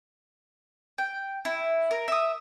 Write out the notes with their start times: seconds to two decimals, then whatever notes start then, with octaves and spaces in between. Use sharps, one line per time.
0.98 G5
1.45 E4
1.91 A#4
2.08 E5 D#6